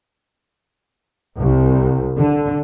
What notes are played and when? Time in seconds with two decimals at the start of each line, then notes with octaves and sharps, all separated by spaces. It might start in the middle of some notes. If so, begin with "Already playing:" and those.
1.36 C2
2.17 D3